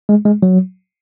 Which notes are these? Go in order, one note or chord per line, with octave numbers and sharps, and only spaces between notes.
G#3
G#3
F#3